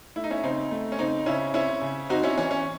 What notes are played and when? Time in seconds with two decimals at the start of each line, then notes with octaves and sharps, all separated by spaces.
0.16 A3 E4
0.24 D#4
0.31 C#4 E4
0.43 C#3 C4 D#4
0.71 A3
0.92 C#4
0.99 C#3 C4 D#4
1.26 C#3 C#4 E4
1.54 C4 C#4 E4
1.81 C#3
2.09 C4 D#4 F#4
2.23 C#4 E4
2.37 E3 C#4
2.51 C#4